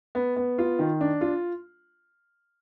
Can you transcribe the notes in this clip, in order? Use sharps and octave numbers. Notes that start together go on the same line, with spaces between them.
B3
B3
F4
D#3
D4
F4